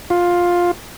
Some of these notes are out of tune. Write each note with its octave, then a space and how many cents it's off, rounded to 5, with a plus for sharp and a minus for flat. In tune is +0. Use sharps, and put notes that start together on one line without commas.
F4 +10